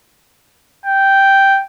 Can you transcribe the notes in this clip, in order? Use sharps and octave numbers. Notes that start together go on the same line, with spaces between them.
G5